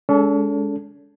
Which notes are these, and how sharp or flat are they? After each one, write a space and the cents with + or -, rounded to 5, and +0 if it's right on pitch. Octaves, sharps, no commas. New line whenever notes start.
G#3 +0 C#4 +45 A4 +0